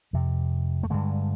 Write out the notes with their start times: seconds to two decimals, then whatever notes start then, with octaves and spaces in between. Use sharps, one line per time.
0.13 F2 C3
0.83 A3
0.90 G2 D3 G#3